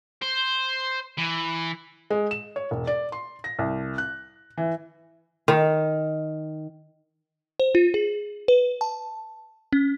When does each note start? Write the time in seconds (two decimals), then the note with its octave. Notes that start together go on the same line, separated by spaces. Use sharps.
0.22 C5
1.18 E3
2.10 G#3
2.31 E7
2.56 C#5
2.71 E1
2.87 D5
3.12 C6
3.44 A#6
3.59 C2
3.98 F#6
4.58 E3
5.48 D#3
7.60 C5
7.75 F4
7.94 G#4
8.48 B4
8.81 A5
9.73 C#4